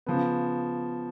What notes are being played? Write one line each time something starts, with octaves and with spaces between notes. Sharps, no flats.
C#3 F3 B3